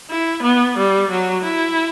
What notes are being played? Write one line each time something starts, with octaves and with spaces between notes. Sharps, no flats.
E4
B3
G3
F#3
E4